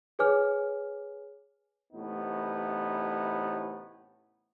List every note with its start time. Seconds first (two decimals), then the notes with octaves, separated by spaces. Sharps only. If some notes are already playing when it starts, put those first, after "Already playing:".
0.19 G#4 B4 C#5 G#5 D6 F6
1.93 A1 A2 C3 B3 D#4